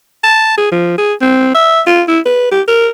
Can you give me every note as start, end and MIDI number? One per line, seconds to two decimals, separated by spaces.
0.24 0.54 81
0.58 0.71 68
0.72 0.97 53
0.98 1.14 68
1.22 1.52 60
1.55 1.81 76
1.87 2.02 65
2.08 2.19 64
2.26 2.51 71
2.52 2.62 67
2.68 2.89 70